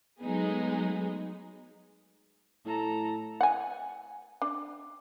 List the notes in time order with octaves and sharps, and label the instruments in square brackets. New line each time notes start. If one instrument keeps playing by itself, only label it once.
[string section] F#3 G#3 A3 B3 D#4 G#4
[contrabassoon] A2 [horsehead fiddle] A4 A#5
[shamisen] F#5 G#5
D4